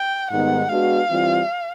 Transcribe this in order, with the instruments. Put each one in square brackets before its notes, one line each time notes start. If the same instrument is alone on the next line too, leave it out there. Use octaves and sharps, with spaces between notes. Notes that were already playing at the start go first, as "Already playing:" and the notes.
Already playing: [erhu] G5
[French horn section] G#2 D#3 G3 B3 [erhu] F#5
[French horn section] G#3 B3 D4 F#4 [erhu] F5
[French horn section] E3 G3 C4 F4